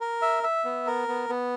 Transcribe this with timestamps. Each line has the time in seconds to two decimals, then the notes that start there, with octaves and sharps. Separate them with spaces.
0.01 A#4
0.22 E5
0.43 E5
0.65 B3
0.87 A#4
1.08 B3
1.29 B3